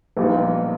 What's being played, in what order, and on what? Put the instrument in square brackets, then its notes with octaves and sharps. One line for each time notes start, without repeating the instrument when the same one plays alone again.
[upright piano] A#1 A#2 G3 B3 D#4